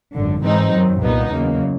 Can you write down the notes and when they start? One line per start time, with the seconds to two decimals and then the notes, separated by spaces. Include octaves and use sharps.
0.14 G#1 F#2 D3
0.43 G#2 E3 G#3 C4 D#4
0.72 F#2 D#3 F#3
1.02 C2 A#2 G3 B3 D#4
1.30 E2 C#3 F#3 A#3